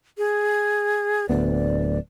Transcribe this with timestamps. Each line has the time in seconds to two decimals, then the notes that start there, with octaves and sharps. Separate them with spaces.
0.18 G#4
1.29 D1 D2 B3 D5